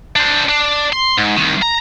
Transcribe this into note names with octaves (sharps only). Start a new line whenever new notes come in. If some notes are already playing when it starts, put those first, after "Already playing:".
D4 C5
D4
C6
G#2
C2 D#3
A#5